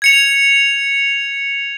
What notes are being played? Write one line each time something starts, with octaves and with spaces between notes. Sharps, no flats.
G#6 C#7 F7